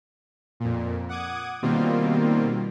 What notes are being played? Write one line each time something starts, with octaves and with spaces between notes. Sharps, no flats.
F2 A#2
F#5 D6 D#6 G#6
B2 D#3 G3 A#3 C4 F4